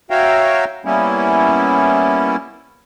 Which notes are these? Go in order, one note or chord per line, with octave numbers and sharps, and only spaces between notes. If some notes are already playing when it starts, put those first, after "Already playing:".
F#4 C#5 E5 F5 G5 A#5
G3 A#3 B3 C#4 E4